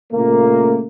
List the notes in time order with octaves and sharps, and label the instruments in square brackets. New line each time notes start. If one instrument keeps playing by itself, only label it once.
[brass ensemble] A#2 C#3 A3 A#3